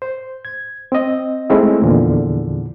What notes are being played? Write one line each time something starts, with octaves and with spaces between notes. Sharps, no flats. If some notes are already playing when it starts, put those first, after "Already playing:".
C5
G#6
C4 D#5
G#3 A3 C4 C#4 D#4 E4
E2 A#2 D3 F3